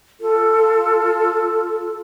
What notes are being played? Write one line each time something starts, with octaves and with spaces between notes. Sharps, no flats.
F4 A4